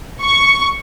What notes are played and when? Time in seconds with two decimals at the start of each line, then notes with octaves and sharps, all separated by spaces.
0.22 C#6